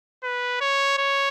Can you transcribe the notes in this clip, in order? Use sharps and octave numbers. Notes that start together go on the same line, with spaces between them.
B4
C#5
C#5